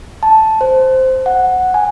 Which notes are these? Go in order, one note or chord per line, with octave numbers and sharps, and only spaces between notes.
A5
C5
F#5
G#5